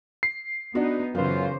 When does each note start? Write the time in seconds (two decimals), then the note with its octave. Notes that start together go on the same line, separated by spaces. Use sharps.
0.23 C7
0.75 B3 D4 D#4 F#4
1.15 F#2 C#3 E3 F4 B4 C5 F5